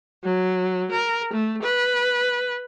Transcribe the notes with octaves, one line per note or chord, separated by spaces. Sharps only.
F#3
A#4
A3
B4